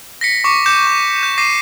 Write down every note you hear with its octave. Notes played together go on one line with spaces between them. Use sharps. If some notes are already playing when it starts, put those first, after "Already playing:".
A#6 B6 C#7
C#6 D6 B6 C#7
D6 G6 C#7 E7
C#6
G6
D6 A#6 C7 D#7